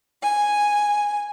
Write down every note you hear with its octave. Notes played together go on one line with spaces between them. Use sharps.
G#5